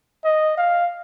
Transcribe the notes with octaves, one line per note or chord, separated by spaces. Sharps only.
D#5
F5